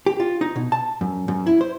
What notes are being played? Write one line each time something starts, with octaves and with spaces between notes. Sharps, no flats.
G4
F4
D#4
B2
A5
F#2
F#2
E4
C5